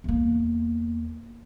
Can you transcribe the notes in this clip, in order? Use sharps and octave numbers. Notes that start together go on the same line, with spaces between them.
E2 A#3